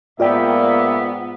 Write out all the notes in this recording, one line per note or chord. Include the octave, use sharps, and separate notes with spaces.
G#2 A#3 B3 F4 D5 E5 G5